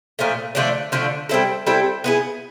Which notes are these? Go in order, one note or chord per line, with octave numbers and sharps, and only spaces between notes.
A#2 F3 A3
D3 F3 A3 D4
D3 F3 A3 D4
G3 C4 E4 A4
G3 C4 E4 A4
B3 E4 G#4